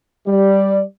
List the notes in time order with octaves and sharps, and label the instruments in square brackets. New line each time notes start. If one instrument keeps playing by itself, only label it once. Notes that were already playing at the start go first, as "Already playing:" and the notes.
[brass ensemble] G3 D5